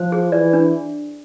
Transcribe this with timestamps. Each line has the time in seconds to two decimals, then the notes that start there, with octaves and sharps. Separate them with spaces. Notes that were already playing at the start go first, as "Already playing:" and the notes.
Already playing: F3 C5
0.12 G#4
0.32 E3 D5
0.53 D4